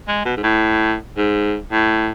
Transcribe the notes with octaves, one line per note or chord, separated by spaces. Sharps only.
G#3
B2
G#2
A2
G#2
A2